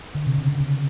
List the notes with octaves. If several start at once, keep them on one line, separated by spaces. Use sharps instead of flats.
D3
C3
C#3
C3
C#3